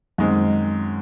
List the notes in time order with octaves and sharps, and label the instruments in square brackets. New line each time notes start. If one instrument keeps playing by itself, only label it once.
[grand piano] F#2 D#3 G#3 C4